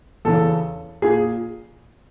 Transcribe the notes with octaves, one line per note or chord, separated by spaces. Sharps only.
E2 C#3 E3 A4
A#2 G#4